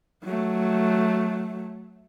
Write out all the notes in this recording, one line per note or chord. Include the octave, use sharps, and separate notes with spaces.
F#3 A3